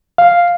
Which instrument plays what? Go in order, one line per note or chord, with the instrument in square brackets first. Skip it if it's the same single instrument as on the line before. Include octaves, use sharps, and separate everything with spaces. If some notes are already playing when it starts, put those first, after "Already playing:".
[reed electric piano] F5